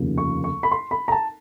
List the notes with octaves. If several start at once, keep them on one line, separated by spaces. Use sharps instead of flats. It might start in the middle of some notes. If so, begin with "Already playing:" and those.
Already playing: F1 D#2 C#3 F3 A#3
C#6
C#6
B5
C6
B5
A#5
A5